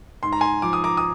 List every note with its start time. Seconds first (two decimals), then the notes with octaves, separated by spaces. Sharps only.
0.23 G#2 C6
0.32 A#5
0.41 G#5 C6
0.62 F3 D6
0.73 D#6
0.84 A#5 D6
0.97 D#6